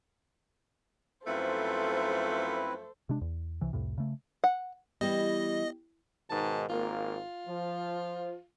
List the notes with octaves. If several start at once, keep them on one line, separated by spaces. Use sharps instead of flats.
F#2 F3 A3 C4 E4 A4 B4 C5
C3 G#3 D4
E2
C2 C3 E3
C2 F2 A2 C3
C#3 A3
F#5
E3 G3 B3 G4 D#5
G#2 B2 D#3 A5
G#1 A#3 F4
F3